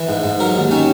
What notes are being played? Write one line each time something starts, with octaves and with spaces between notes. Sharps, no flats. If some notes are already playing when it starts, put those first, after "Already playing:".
Already playing: E3
G#2
G#2
F#3 A#4
D#2
D#3 C#4